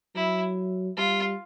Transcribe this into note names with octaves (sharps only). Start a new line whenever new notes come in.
F#3 E4
G3 F4